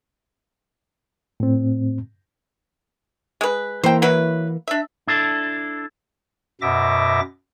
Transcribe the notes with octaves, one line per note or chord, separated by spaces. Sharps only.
A2 C4
G#3 B4
E3 A#3 C5 G5
F#3 E4 B4
D4 E5
D4 E4 A4
F#2 B2 E5 D6 A#6